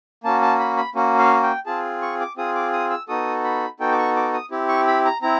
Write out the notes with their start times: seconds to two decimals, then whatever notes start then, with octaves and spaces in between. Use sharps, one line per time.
0.24 A#3 C#4 F#4 A5
0.42 A5
0.59 B5
0.77 B5
0.95 A#3 C#4 F#4
1.19 F5
1.43 G5
1.66 C4 F4 G#4 A5
2.02 C#6
2.20 D6
2.37 C4 F4 G#4 D#6
2.55 D6
2.73 D#6
2.90 E6
3.08 B3 D#4 F#4 A4 D#6
3.44 B5
3.80 B3 D#4 F#4 A4 G5
3.92 D6
3.98 C#6
4.16 D6
4.33 D#6
4.51 C4 E4 G4
4.68 C#6
4.87 B5
5.05 A#5
5.22 C4 E4 A#5